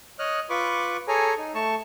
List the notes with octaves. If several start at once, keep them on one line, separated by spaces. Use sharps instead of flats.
C#5 D#5 D#6 F6 F#6
F4 B4 B5 C#6 D6
G#4 A4 C#5 G#5 A#5
D#4
A3 A5 C#6